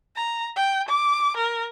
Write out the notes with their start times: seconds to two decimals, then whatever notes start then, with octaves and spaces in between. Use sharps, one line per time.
0.15 A#5
0.56 G5
0.89 D6
1.37 A#4